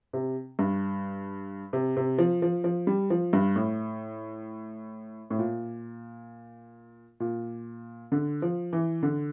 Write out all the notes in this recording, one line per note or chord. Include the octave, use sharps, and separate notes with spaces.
C3
G2
C3
C3
F3
F3
F3
G3
F3
G2
A2
A2
A#2
A#2
D3
F3
E3
D3